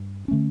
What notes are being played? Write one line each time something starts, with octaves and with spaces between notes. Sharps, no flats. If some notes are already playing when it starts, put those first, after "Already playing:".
Already playing: G2
D3 A3 C#4